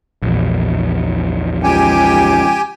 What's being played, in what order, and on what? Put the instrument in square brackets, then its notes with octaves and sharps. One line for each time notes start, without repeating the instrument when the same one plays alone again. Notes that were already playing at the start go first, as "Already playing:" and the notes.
[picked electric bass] A#1 E2
[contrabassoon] C#2 [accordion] G4 G5 G#5